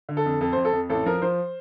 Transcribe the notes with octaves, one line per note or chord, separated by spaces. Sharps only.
D3
A4
F2
F2 A4
F2 C5
A4
F2
A1 A4
F3 A#4
F3 C5